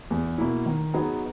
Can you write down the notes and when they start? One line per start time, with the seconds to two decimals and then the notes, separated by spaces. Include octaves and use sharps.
0.10 E2
0.38 B2 A#3 E4
0.66 D#3
0.94 F#3 B3 D#4 G#4